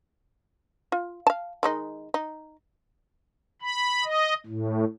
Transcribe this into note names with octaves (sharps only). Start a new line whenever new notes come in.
F4
F5 A5
D#3 G#3 D#4
D#4
B5
D#5
A2